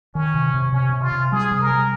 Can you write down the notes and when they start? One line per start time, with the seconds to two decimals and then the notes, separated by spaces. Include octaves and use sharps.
0.14 D#3 C#4
0.34 C3
0.54 C3
0.72 C3 C#4
0.93 C3
1.02 F4
1.12 C3
1.32 G3 G#4
1.51 C3
1.60 A#4
1.71 G3